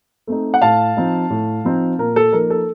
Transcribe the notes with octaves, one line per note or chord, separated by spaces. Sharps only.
A3 C4 D#4
F#5
A2 F5 A5
F3 C4 D#4
A2
F3 C4 D#4
A#2 A#4
A4
F3 A#3 D#4 A#4
A4